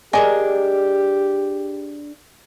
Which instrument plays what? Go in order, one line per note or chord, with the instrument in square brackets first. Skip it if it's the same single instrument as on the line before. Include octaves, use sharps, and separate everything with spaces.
[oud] D4 G#4 A#4 [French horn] G4 [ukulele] D#5 G#5